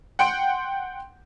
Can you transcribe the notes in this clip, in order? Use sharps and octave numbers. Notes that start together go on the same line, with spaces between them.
F#5 G5 C6 D7